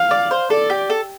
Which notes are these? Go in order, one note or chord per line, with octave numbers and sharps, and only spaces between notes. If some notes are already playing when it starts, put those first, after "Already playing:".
Already playing: F5
D5
C5
A4 D5
G4
A4